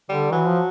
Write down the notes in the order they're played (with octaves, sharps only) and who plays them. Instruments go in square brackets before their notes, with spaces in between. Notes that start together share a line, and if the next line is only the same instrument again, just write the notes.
[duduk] D3 [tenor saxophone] G3
[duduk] E3 [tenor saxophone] F#3
[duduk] F3